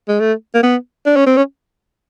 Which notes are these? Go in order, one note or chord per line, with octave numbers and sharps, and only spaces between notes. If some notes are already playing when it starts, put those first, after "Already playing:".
G#3
A3
A#3
B3
D4
C#4
C4
C#4